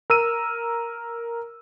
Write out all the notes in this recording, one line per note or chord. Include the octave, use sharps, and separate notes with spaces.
A#4 E6 D#7